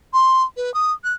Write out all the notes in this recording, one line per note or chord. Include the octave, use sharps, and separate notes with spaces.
C6
B4
D#6
F#6